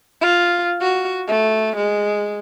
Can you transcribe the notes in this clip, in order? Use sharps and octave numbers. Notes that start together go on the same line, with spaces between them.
F4
F#4
A3
G#3